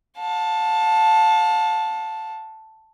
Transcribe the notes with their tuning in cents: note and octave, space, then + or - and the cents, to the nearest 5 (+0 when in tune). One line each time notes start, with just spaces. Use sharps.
F5 +45 A5 +0